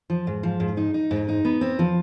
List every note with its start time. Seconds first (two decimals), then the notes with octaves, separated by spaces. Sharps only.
0.10 F3
0.27 G#2
0.43 F3
0.60 G#2
0.77 D#4
0.94 D#4
1.11 G#2
1.29 D#4
1.45 B3
1.61 C4
1.79 F3